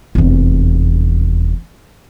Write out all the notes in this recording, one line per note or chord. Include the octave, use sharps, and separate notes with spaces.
F1 E2